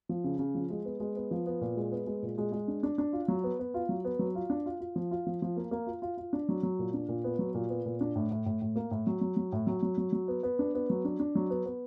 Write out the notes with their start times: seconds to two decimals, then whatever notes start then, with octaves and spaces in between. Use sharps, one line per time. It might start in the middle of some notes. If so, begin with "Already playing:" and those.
0.09 F3
0.24 C#3
0.39 C#3
0.55 F3
0.70 G#3
0.85 B3
1.00 G#3
1.16 B3
1.31 F3
1.46 B3
1.61 A#2
1.77 G#3
1.92 B3
2.07 G#3
2.23 A#2
2.38 G#3
2.52 G#3
2.68 D4
2.83 D4
2.98 D4
3.13 F4
3.28 F#3
3.44 B3
3.59 B3
3.74 F4
3.89 F#3
4.05 B3
4.19 F#3
4.35 F4
4.50 D4
4.66 F4
4.80 F4
4.96 F3
5.11 F4
5.26 F3
5.42 F3
5.57 A#3
5.71 A#3
5.87 F4
6.02 F4
6.17 F4
6.33 D4
6.49 F#3
6.63 F#3
6.79 A#2
6.94 D4
7.08 A#2
7.24 B3
7.39 F#3
7.54 A#2
7.70 B3
7.86 A#2
8.01 D4
8.16 A2
8.31 A2
8.46 A2
8.62 A2
8.76 A#3
8.91 A2
9.07 F#3
9.21 F#3
9.37 F#3
9.52 A2
9.67 F#3
9.83 F#3
9.98 F#3
10.13 F#3
10.28 B3
10.43 B3
10.59 D4
10.75 B3
10.90 F#3
11.05 D4
11.19 D4
11.35 F#3
11.50 B3
11.66 B3